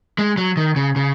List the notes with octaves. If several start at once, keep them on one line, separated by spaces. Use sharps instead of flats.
G#3
F#3
D#3
C#3
C#3